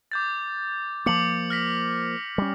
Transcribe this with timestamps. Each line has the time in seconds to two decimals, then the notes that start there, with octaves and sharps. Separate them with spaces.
0.12 D6 G6 A6
1.06 F3 A#3 D6 C#7 F#7
1.50 F6 A#6 B6
2.38 G3 C#4